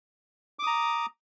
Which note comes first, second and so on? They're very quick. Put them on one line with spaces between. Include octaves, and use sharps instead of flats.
D6 D#6 A#5